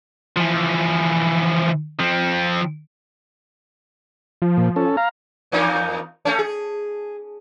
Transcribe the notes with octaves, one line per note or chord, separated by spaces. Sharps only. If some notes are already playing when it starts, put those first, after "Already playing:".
E3 F3
F3 C4
F3
A#2
C#4 A4
F5 A#5
E2 A#3 D#4
A3 C#4
G#4